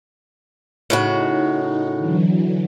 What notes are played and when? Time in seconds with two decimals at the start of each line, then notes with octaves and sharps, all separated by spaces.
0.90 A2 C#3 D#4 F#4
1.98 D3 E3 F#3